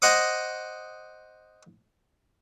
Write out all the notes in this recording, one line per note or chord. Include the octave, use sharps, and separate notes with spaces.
C5 D#5 F#5 D6 D#6